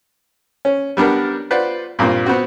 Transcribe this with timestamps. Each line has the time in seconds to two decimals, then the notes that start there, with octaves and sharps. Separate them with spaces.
0.65 C#4
0.97 G3 B3 D4 A#4 F#5
1.50 F4 B4 C5 D5 F#5
1.99 G2 A#2 A#3 C4 F4
2.26 B3 C4 F#4